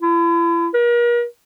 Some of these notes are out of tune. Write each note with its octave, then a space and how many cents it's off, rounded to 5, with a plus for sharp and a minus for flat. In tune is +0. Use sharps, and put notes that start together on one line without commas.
E4 +40
A#4 +40